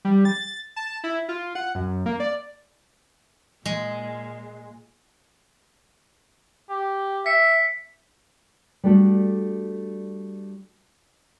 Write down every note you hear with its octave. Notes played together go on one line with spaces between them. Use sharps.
G3
A6
A5
E4
F4
F#5
F#2
A#3
D5
A#2 G#3
G4
E5 B6 C#7
G3 A3 D4 F#4 A4